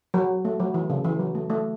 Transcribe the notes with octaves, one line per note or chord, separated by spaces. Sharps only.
F#3
A3
F#3
E3
C#3
E3
F#3
A3
A3